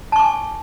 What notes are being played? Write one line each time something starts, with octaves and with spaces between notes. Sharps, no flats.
G#5 A5 C#6 D6